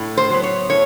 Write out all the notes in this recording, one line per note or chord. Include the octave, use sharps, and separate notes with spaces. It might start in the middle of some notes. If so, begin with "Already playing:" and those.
Already playing: A2
C5
F#3 B3
C#5
A2 C#5